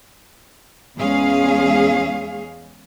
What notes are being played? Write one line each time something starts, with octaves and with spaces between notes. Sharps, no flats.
E2 G#3 C#4 G#4 F5